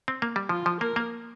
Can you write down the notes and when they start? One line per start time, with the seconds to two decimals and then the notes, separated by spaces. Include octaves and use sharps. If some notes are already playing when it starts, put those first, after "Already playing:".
0.08 C4
0.22 A#3
0.36 G3
0.49 F3 F4
0.66 F3
0.80 A#3 A#4
0.96 A#3